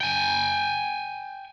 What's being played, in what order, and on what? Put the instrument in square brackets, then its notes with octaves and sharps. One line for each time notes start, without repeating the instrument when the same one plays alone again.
[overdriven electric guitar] G5 G#5